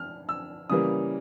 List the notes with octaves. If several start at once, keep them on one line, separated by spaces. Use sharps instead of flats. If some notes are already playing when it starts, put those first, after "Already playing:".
Already playing: F6
E6
C#3 E3 G3 A#3 D#6